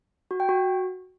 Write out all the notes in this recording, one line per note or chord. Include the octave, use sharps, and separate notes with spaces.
F#4
G5
F#4